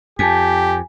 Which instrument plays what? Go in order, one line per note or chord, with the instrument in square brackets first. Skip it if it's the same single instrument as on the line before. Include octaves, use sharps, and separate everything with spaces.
[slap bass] F2 [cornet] G4 [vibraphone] G#5 [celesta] A5 B6